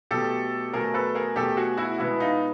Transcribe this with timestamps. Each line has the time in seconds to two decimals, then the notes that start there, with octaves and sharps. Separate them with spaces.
0.11 B2 F#3 A3 G4 A4
0.73 B2 F#3 A3 G#4 A#4
0.94 A4 B4
1.15 G#4 A#4
1.36 B2 F#3 A3 G4 A4
1.57 F#4 G#4
1.78 E4 F#4
1.98 B2 G#3 B3 E4 F#4
2.20 D#4 F4